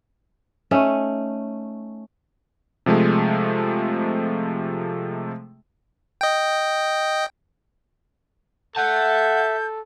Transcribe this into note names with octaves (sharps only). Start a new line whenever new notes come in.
A3 C#4 D#4
C3 F3 G#3 A3
D#5 G5
A4 E5 F#5 A5 G6